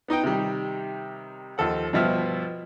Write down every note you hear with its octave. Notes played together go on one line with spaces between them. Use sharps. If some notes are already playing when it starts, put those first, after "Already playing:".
B3 D#4 D#5 G5
C3 D#3 G3
D#2 F3 A4 F#5
G2 B2 F3 E5 F6